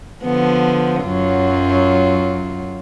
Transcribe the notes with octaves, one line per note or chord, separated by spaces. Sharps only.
D3 F3 B3
F#2 F#3 F4